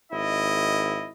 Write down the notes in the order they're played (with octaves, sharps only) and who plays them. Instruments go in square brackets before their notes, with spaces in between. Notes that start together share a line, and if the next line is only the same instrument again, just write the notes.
[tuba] G#1 [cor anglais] E4 [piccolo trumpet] D#5